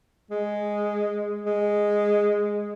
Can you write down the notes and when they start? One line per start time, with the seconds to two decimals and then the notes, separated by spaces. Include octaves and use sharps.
0.31 G#3
1.46 G#3